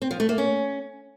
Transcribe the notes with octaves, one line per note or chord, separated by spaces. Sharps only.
C4
F3
A3
A#3
C#4